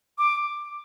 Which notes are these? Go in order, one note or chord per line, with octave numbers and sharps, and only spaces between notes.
D6